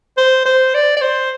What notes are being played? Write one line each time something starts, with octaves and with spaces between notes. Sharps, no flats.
C5
C5
D5
D5
C5